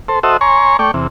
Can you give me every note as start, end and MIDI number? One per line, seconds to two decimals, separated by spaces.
0.08 0.19 69
0.08 0.19 72
0.23 0.37 66
0.23 0.37 69
0.23 0.37 72
0.23 0.37 75
0.23 0.37 76
0.41 0.77 73
0.41 0.77 80
0.41 0.77 82
0.41 0.77 84
0.41 0.77 85
0.79 0.91 57
0.79 0.91 74
0.79 0.91 79
0.79 0.91 85
0.94 1.07 40
0.94 1.07 48